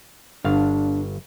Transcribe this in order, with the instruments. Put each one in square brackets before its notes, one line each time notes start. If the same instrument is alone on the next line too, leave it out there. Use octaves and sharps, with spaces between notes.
[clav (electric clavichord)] G1 F5 [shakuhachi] D4